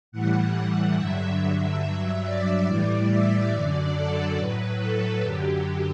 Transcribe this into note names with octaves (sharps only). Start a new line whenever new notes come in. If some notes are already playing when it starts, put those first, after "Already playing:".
A2 E3 G3 F#5
G2 D3 F#3 E5
E5
G2 F#3 E5
D5
A2 E3 G3 D5
E5
F#2 D3 F#3 D5
A4
A2 F#3 B4
A4
F#2 D3 F#3 G4